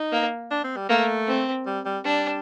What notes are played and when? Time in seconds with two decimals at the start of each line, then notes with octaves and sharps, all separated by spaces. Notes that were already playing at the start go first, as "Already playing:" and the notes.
Already playing: D#4
0.12 A#3
0.51 D4
0.64 C4
0.76 G3
0.89 A3 A#3
1.27 C4
1.66 G3
1.85 G3
2.05 G3 D4